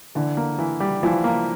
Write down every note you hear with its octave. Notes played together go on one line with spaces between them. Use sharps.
D3 E3
A#3
E3
G3
E3 F3
A#3